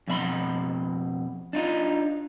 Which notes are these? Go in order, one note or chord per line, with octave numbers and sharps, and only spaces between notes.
F2 B2 E5 B5 C6
D4 D#4 F4